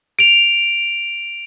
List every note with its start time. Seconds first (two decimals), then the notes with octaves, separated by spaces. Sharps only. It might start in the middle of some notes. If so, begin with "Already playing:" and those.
0.19 D7 F7